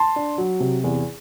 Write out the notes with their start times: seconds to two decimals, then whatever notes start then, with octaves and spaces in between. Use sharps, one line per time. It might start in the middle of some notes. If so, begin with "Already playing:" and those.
Already playing: A5 C6
0.16 D4
0.38 F#3
0.60 C3
0.84 E2